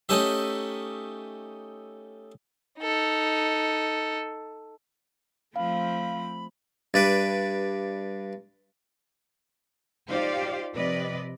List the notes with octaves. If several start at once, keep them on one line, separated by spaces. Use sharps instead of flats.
A3 C#4 D#4 G4 E5
D#4 A4
F3 A3 C4 F5 B5
G2 D4 B4
D#4 F4 G4 C5 D5 F5
C3 F3 B4 D5 D#5